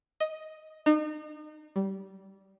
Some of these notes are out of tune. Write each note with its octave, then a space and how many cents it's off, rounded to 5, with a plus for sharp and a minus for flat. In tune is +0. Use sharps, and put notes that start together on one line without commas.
D#5 +5
D#4 -35
G3 -20